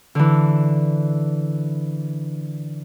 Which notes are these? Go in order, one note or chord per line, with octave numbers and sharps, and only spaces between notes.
D3 E3